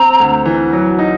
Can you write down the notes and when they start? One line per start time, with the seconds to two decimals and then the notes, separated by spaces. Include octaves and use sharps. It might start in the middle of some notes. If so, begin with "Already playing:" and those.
Already playing: C4 A#5
0.20 D2
0.46 E3
0.73 F#3
0.99 D#4